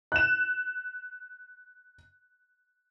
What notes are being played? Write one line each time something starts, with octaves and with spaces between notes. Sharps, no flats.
F#6 E7